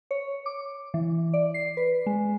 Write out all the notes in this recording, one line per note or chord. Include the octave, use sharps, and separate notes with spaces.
C#5
D6
E3
D5
C7
B4
G#3